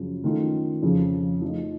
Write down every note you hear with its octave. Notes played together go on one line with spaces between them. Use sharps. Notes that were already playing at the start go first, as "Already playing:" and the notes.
Already playing: F#2 C#3 F3
D#3 A3 C#4 F4 A4
F2 C#3 F3
F3 A3 D#4